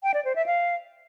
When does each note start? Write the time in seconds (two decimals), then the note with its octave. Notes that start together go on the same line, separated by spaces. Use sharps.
0.03 G5
0.14 D5
0.25 C5
0.36 E5
0.46 F5